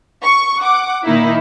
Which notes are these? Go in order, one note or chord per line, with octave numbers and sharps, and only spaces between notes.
C#6
F#5 D6
A#2 D#3 A#3 D#4 E4